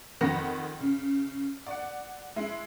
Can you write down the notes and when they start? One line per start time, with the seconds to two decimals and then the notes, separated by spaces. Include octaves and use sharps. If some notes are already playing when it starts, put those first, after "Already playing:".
0.21 F2 D#3 F#5 B5 A#6
0.80 C#3
1.67 D5 F#5
2.36 G#3 E4